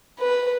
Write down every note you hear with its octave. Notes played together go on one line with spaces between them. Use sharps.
B4